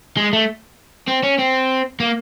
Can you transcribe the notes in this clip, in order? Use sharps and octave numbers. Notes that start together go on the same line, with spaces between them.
G#3
A3
C4
C#4
C4
A#3